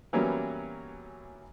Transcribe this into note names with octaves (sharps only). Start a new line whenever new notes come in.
E3 F#3 G3 A#3 B3 C#4